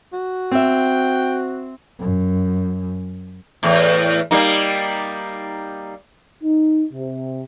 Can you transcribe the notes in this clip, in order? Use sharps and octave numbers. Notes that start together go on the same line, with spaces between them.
F#4
C4 E5 G5
F#2
E2 A2
G3 A#3 D#4
D#4
C3